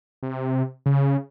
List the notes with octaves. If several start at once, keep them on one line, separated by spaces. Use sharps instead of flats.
C3
C#3